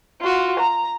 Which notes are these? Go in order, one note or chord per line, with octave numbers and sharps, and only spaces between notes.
F4 F#4
A#5